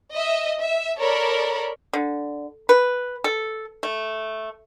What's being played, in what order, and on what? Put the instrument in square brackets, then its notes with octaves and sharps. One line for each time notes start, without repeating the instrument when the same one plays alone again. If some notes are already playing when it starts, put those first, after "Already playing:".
[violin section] D#5 E5
E5
A4 A#4 C#5 D5 B5
[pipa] D3
B4
A4
A3